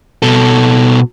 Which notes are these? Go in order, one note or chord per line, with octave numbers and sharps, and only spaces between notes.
B2 A4